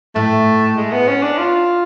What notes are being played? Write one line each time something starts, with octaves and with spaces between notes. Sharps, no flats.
A2 A3
G#3
B3
C#4
D4
F4